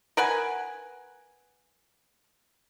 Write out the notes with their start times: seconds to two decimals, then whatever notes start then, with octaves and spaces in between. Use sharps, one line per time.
0.17 A#4 B4 F#5 G#5